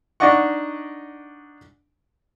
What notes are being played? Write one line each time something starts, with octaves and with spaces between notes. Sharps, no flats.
D4 D#4 D5 D#5 F#5 C#6